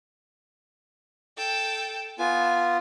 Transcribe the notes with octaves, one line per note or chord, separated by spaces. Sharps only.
A4 G5
B3 F4 G#5